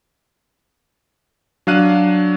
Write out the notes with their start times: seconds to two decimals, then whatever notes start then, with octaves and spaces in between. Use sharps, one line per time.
1.67 F#3 D4 F5 F#6 D#7